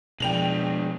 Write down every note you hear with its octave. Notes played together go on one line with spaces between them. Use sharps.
B2 F3 G#3 D4 G5 F7 F#7